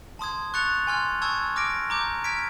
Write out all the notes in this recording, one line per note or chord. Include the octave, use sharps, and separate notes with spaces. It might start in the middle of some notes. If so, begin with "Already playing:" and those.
A5 C6 D#6 G#6
C#6 F#6 A6 C#7 F7
G#5 C6 F6 G#6
A5 C#6 E6 G#6
D6 F6 A#6 D7
A#5 D6 G6
F6 G#6 B6 D7